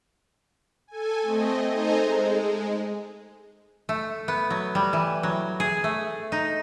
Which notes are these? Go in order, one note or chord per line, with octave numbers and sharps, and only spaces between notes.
A4 G#5
A3 C4 D#5
D#4 A4 C5 D#5 G#5 A#5
G#3
A3
B3
F#3
G3
E3
F#3
G#4
A3
D#4